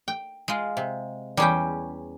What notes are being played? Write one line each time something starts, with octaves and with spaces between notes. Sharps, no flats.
G5
G#3 F4
C3
E2 G3 C#4 G#4 G5